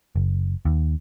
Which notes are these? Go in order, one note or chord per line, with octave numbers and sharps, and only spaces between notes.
F#1
D#2